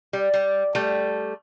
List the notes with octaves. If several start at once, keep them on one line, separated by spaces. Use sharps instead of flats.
G3
G3
G3 A3